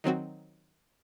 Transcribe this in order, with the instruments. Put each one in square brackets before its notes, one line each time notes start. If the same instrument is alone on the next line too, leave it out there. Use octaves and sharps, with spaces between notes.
[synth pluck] D#3 F#3 C4 F#4